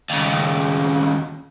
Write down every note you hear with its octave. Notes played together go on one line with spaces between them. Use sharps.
D#2 C#3